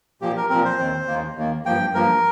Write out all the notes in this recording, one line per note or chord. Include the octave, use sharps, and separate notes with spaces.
A#2 F3 A#3 G4
A#4
A#2 F3 C4 A#4
C5
D#2 D#3 C4
D#2 D#3 A#3
D#2 D#3 A#3
G2 F3 A#3 G5
G2 F3 A#3 A#4